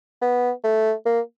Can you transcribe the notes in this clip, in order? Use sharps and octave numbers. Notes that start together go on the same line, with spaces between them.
B3
A3
A#3